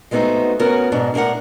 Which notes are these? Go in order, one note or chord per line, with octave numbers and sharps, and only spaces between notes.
G#3 A3 B3 C4 D#4 F#4
C#3 B3 C#4 F#4 A#4
G#2 B2 D4
A2 D4 G4 A#4 F#5